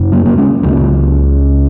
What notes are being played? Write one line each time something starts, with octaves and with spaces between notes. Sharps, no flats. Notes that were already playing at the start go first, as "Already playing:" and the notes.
Already playing: F#2 C#3
F#3 A#3
A#3
G#3 C#4
C#2 C#3 F#3 A#3